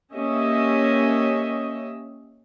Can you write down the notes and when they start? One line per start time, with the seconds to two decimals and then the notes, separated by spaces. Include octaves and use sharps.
0.14 A#3 C#4 G4 D#5 E5